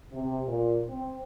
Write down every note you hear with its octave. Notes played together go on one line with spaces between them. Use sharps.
C3
A#2
C4